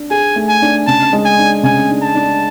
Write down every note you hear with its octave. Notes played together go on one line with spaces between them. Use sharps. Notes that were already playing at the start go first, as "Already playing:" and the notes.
Already playing: D4
G#4 G#5
A3
G#5
D4
C#3 A5
G#3
G#5
D4
C#3 G#5
D4
A5
D4